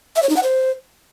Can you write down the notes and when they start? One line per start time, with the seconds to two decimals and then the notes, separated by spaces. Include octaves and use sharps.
0.16 E5
0.23 C#5
0.29 D#4
0.36 F#5
0.43 C5